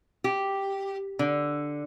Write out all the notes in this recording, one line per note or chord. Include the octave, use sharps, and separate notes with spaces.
G4
D3